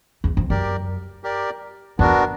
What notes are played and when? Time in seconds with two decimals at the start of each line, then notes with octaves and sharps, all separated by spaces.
0.24 E2
0.37 F2
0.50 F#2 G4 A#4 D5
1.24 G4 A#4 D5
1.99 E2 B3 D4 F#4 A#4